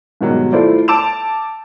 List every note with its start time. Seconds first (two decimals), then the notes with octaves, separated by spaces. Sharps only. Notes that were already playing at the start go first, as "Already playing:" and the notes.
0.21 G#2 B2 D#3 F#3 G3
0.53 A3 E4 F4 A4 C5 D5
0.88 A5 D6 E6 D7 E7 F7